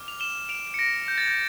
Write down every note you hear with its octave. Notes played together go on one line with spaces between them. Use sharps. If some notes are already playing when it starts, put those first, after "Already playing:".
Already playing: D6 F6
F7
E7 G7
D7 F7
C#7
A#6 D7
G6
A6
G6